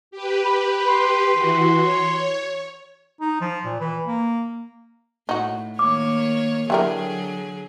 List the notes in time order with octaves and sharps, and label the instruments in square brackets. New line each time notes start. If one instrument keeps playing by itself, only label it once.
[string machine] G4 B4
[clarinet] B5
C6
[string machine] E3 F#4
C#5
[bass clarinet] D#4
F3
A#2
E3
A#3
[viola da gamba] A2 [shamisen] D#4 F#4
[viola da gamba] D#3 A#3 C#5 [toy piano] D6
[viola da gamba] D3 F#3 G#4 [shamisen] E3 G3 A#4